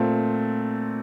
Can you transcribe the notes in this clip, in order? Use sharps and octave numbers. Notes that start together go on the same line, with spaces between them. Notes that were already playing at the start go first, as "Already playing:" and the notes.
Already playing: A#2 A3 C4